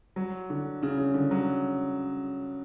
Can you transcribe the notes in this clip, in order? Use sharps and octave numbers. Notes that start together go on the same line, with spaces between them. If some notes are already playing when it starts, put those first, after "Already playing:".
F#3
D3
C#3
C#3
D3
F#3